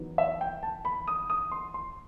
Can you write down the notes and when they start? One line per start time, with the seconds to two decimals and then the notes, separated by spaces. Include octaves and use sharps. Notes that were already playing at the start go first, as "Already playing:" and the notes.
Already playing: E2 D#3 F#3 B3 D#4
0.18 E5
0.41 G5
0.63 A5
0.85 B5
1.08 D#6
1.30 D#6
1.52 C6
1.74 C6